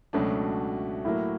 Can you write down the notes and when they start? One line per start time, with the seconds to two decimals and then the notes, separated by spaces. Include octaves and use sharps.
0.13 C#2 B2 F#3 A3 C#4 D4
1.05 A2 F#3 A#3 E4